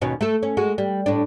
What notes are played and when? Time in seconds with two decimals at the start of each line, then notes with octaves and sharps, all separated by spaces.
0.01 D#2 B2 C#4
0.21 A3 A4
0.43 C#4
0.57 G#3 F#4
0.78 G3
1.06 A2 D4